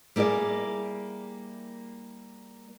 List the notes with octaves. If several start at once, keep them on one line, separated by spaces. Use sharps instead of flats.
G3 A#3 E4 G#4 D5